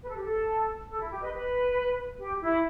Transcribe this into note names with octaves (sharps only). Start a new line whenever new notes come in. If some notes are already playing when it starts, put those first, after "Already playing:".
B4
A4
G4
A4
A4
E4
G4
B4 D#5
B4
G4
E4